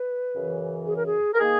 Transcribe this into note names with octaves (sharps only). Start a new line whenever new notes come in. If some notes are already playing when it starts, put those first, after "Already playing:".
Already playing: B4
F#2 C#3 E3
G#4
A#4
G#4
A#4
D#3 A#3 G#4